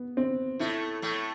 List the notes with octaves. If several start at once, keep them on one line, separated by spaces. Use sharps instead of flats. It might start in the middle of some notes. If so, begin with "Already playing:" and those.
Already playing: B3
C4
A2 A3 E4
A2 A3